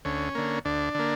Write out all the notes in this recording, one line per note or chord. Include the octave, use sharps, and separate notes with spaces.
D2 C#4
D3 A#3
D2 D4
D3 A#3